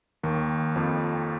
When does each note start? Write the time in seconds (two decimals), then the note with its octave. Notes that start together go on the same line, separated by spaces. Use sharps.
0.23 D#2 D#3
0.76 F2 F3